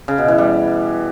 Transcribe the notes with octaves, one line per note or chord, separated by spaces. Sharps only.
C#3
B2
E3
G3